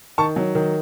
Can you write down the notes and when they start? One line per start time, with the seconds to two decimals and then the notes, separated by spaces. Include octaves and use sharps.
0.18 D#3 A5 C#6
0.36 F#3
0.55 D#3